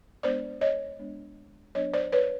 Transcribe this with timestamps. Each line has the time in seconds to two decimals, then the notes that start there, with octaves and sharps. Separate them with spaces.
0.23 G#3 B3 D4 C5 D5
0.61 C#5 D#5
0.99 G#3 B3 D4
1.75 F#3 B3 D4 C#5 D#5
1.94 C5 D5
2.12 B4 C#5